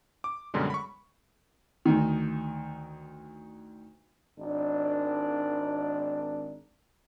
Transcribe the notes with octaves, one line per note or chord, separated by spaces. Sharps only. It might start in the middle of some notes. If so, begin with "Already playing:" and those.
D6
F#2 B2 D3 G3 G#3
B5 C#6
D2 D#3
G#1 D4